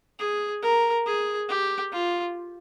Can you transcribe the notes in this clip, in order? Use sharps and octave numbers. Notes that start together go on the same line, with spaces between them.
G#4
A#4
G#4
G4
F4